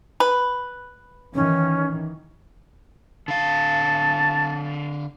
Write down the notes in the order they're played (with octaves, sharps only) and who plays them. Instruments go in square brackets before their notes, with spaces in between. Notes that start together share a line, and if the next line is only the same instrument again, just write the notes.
[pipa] B4
[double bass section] D#3 E3 [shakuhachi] C#4
[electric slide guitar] D3 F5 [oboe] A5